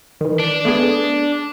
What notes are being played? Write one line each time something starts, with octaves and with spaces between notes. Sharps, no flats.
D#3 E3
D4
A3 B3 G#4